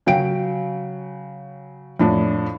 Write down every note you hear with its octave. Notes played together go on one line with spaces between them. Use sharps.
C#3 F#3 G5 D7
F2 A2 D4